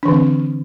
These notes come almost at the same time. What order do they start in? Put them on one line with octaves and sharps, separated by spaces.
D4 E3 D3 C4